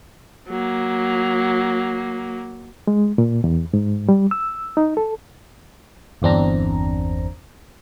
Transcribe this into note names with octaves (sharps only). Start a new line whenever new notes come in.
F#3 A#3
G#3
A#2
E2
G#2
G3
E6
D#4
A4
G1 E2 C4 D4 A#5